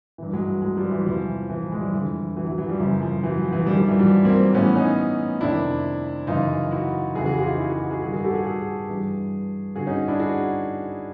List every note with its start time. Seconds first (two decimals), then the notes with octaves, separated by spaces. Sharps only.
0.18 G2 E3
0.33 F#3 G#3
0.62 F#3 G#3
0.77 F3 G3
0.91 E3 F#3
1.06 E2 C3 E3 F3
1.50 E3
1.64 F3
1.72 G#3
1.79 F3 G3
1.93 F2 D3 E3
2.36 E3 F#3
2.47 E3 F#3
2.58 E3 F#3
2.69 F3 G3
2.79 F#2 C#3 E3 F3
3.01 F3
3.23 E3 F#3
3.38 F3
3.52 E3 F#3
3.66 G2 D#3 F3 G3
3.77 F3 G3
3.89 E3 F#3
3.99 F3 G3
4.25 A#3 C4
4.53 A2 E3 B3 C#4
4.75 C#4 D#4
5.41 F2 C3 D#3 D4 E4
6.27 F#2 C#3 E3 D#4 F4
6.71 E4 F#4
7.15 F2 C#3 E3 F#4 G#4
7.25 F#4 G#4
7.37 F4 G4
7.43 F#4
7.47 D#4 F4
7.58 E4 F#4
7.69 F#4 G#4
7.90 F#4 G#4
8.02 G2 D#3 F#4 G#4
8.13 F#4 G#4
8.24 G4 A4
8.34 F#4 G#4
8.45 F#4 G#4
8.88 G2 E3
9.76 G2 D3 F#4 G#4
9.87 C#4 D#4
10.08 D4 E4
10.19 F#4 G#4